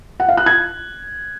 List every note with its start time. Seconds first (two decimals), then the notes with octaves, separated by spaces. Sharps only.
0.20 F#5
0.29 F5
0.37 F#6
0.46 G#6